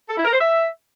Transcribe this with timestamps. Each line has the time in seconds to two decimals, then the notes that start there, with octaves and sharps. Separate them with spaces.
0.09 A4
0.17 E4
0.25 A#4
0.33 C5
0.41 E5